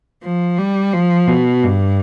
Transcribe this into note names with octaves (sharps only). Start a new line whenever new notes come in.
F3
G3
F3
B2
G2